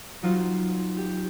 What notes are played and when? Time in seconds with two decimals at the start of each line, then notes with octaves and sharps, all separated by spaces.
0.23 F#3 D#4 F4 C5
0.97 G4